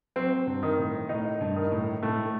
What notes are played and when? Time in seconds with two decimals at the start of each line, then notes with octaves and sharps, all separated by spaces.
0.16 F#3 C4
0.47 G2
0.63 D#3
0.78 A2
1.09 A2 D#4
1.41 G2
1.56 D#3
1.72 A2
2.03 A2 A3